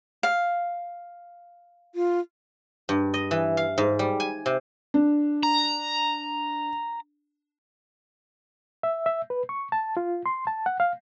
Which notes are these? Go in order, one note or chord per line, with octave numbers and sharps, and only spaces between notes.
F5
F4
G2
D#5
E3
F5
G#2
G3
G#5
C3
D4
A#5
E5
E5
B4
C#6
A5
F4
C6
A5
F#5
F5